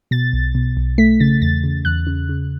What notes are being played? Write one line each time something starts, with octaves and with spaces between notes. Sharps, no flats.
B2 A6
B1
B2
B1
A3 B6
C#3 A6
E2 A6
C#3
E2 F#6
C#3
C#3